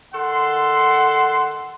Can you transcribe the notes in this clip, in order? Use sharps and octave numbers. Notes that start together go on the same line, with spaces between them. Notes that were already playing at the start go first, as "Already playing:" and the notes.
D#3 A4 F#5 C6